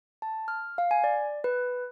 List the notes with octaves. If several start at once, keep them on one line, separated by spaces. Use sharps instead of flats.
A5
F6
F5
G#5
D5
B4